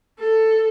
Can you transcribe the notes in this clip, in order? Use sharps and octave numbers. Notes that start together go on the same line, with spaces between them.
A4